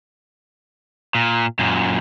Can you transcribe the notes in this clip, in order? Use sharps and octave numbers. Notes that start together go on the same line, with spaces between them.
A#2
F#2 A#2